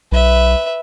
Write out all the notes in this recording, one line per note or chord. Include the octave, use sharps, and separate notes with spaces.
B1 B4 E5